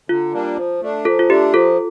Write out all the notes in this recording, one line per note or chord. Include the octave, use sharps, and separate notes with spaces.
D3 F4
G3 A#3 D4
F3
A3 D4
F3 F4 A4
F4
A3 D4 G4
F3 F4 A4